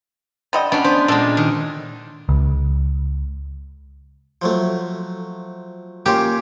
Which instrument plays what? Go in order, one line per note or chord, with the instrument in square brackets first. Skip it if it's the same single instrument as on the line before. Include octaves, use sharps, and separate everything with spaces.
[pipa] D3 G3 D#5
[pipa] B3 F#4 [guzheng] C#4 D4
[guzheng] B3 [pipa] C5
[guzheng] A#2 G#3 [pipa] A4 D5
[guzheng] D#3
[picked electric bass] C#2
[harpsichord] F3 F#3 A3
[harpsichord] A#3 C#4 F4 [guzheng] G4